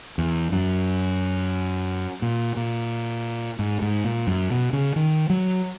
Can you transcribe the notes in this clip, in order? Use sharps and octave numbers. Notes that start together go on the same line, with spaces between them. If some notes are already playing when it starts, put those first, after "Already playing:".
E2
F#2
A#2
A#2
G#2
G#2
A#2
F#2
B2
C#3
D#3
F#3